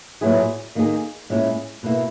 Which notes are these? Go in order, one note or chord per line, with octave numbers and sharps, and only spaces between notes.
A#2 F#3 B3 E4 G#4
D#3 A#3 D#4 G#4
A#2 G#3 C#4 E4
B2 A#3 E4